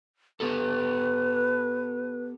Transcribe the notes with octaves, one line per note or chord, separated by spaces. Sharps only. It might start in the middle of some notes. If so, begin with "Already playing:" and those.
B3 G4 A4 B4